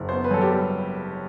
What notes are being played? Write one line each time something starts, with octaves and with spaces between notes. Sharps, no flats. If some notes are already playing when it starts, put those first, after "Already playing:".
Already playing: F#1
B3 C5
B4
F#2 A4
G4
G3